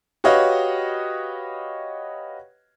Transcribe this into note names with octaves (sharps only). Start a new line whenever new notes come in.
F#4 G4 B4 C#5 D#5 F5